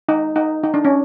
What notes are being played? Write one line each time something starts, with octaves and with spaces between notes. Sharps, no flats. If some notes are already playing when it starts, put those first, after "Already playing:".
D#4
D#4
D#4
D4
C#4